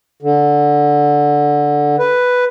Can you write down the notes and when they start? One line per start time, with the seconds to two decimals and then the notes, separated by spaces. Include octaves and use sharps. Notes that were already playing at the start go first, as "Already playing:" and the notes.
0.22 D3
1.99 B4